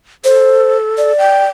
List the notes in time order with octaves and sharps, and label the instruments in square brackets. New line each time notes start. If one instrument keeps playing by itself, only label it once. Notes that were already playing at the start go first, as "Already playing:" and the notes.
[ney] A4 [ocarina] C5
[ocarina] D5
[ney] G5